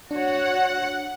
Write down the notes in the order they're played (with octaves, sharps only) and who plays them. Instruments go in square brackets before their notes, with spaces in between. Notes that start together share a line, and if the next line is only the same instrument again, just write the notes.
[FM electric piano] D4 [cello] F#4 C#5 [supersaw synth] F#5